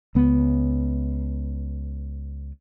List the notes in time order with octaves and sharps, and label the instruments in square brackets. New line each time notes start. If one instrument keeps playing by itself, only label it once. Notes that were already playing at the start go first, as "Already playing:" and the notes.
[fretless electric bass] C#2 B3